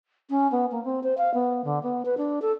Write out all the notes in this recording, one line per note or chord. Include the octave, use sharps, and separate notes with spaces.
C#4
B3
A#3
C4
C5
F5
B3
D3
B3
B4
D4
A4